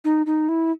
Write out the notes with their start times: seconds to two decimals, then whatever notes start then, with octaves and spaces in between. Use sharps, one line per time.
0.04 D#4
0.26 D#4
0.49 E4